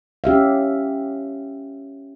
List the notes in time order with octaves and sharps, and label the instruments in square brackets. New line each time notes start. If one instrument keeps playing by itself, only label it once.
[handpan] C#4 G4 E5 F5